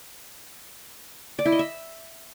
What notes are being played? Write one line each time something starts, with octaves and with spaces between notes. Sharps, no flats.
D5
E4
D#5
E5